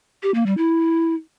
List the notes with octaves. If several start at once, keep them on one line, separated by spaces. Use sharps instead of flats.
G4
A#3
G3
E4